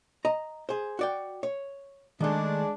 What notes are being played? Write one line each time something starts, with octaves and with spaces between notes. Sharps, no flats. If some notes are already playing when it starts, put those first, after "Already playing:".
D#5 A#5
G#4 C5
F#4 D5 G5
C#5
D#3 G#3 A3 D4